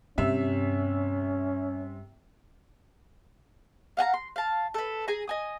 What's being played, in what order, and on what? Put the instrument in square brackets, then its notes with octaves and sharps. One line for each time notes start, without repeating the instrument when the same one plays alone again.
[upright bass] G2 C4 [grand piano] C3 E5 [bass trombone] C#4
[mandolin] F5 F#5 G#5 A#5
C6
F5 A5
A4 B4
G#4 G#5 A#5
D#5 G#5 D#6